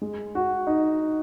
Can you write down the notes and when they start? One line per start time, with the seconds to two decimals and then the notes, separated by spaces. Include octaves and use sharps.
0.02 G#3
0.35 F#4
0.67 D#4